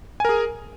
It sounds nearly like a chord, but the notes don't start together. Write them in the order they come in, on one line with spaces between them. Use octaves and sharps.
G#5 A#4 G#4